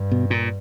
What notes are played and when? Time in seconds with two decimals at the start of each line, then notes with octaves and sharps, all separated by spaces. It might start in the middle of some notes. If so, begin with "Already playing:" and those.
Already playing: G2
0.12 B2
0.30 A#2